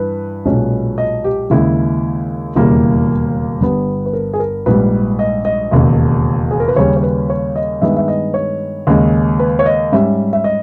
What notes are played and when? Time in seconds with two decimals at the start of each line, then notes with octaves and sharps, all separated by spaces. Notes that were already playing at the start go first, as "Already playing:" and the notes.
Already playing: G2 E3 B4
0.45 B1 A#2 G#3 C#4
0.98 D#5
1.24 G4
1.50 D#2 C#3 G#3 E4
2.55 E1 D#2 C#3 G3 A#3 E4
3.60 G1 G2 G3 B3
4.06 B4
4.13 A#4
4.33 G#4
4.39 A#4
4.66 A#1 G#2 G3 B4
5.19 D#5
5.45 D#5
5.71 E1 D#2 C#3
6.51 G#4
6.60 A#4
6.68 B4
6.76 D#2 C#3 G3 C#4 C#5
6.97 C#5
7.03 B4
7.30 C#5
7.56 D#5
7.81 G2 D#3 G#3 B3 E5
7.97 E5
8.08 D#5
8.34 C#5
8.87 D#2 C#3 G#3
9.40 B4
9.59 C#5
9.66 D#5
9.92 G#2 G3 C#4 E5
10.33 E5
10.44 D#5